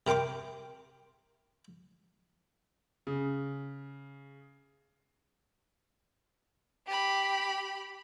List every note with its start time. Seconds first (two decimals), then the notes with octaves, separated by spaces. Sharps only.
0.07 C3 A#4 G5 C6 D6
3.07 C#3
6.86 G4 B5